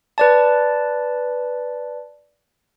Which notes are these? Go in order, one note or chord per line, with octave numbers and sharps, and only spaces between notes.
B4 D5 A5